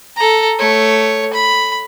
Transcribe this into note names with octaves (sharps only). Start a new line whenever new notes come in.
A4 A#5
A3 C#5
B5